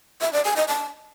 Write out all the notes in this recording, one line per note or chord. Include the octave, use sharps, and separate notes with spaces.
E5
D5
G#5
D#5
A5